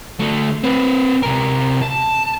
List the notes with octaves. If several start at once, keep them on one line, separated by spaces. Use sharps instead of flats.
D3 A3
C4 B4
C3 A#4
A5